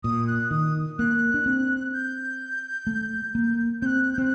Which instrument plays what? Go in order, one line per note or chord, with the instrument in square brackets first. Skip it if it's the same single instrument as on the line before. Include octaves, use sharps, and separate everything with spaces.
[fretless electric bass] A#2 [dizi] D#6
[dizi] F#6
[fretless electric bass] D#3 [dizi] D#6
[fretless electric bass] A#3 [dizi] F#6
[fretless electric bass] D4
C4
[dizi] G6
[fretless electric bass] A3
A#3
[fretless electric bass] C4 [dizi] F#6 G6
[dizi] G6
[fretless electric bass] C4 [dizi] F#6